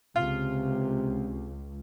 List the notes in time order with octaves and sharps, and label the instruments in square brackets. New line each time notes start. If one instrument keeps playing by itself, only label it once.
[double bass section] C#2 [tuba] C3 [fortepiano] F4